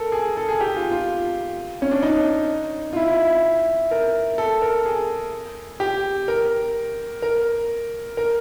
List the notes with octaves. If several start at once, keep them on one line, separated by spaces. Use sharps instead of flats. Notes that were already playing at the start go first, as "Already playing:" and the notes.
Already playing: A4 A#4
G#4
A4
G#4
G4
F4
F4
C#4
D4
D#4
F4
E4
A#4
A4
A#4
G#4
G4
A#4
A#4
A#4